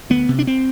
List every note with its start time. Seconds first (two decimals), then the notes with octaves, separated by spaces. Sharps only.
0.10 D2 B3
0.29 C3
0.39 D4
0.47 C4